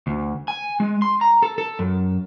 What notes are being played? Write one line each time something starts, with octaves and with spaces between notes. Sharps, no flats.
D2
G#5
G#3
C6
A#5
A4
A4
F#2